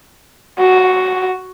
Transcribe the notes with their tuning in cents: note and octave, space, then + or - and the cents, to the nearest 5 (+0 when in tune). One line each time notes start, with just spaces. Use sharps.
F#4 +5